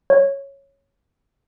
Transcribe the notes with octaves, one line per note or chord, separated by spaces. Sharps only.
C#5